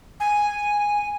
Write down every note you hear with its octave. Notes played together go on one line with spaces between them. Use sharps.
G#5